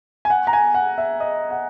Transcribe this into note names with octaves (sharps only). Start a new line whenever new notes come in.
G#5
F#5
A#5
G#5
F#5
E5
D#5
F#5